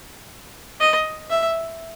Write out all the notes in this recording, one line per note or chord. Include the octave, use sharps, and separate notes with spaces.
D#5
E5